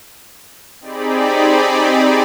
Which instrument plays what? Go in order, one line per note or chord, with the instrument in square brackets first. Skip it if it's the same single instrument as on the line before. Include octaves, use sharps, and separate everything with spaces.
[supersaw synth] C4 D#4 G4 G#4 D5 B5